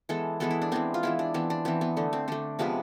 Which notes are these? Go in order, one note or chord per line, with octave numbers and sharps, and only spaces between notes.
E3 G#3 B3 A4
E3 G#3 B3 A4
E4
D4
E3 G#3 B3 C4
F4
E3 G#3 B3 E4
D4
E3 B3 C4
D4
E3 B3 C4
B3
D3 A3
C4
D3 A3 D4
C3 F3 G#3 B3 B4